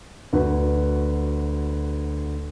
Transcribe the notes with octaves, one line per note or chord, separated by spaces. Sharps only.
D2 F#4 B4